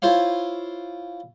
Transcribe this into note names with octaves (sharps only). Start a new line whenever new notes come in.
E4 F4 C5 C#5 F5